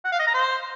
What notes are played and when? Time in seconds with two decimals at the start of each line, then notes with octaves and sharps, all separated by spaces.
0.05 F#5
0.12 F5
0.19 D#5
0.27 A#5
0.34 C5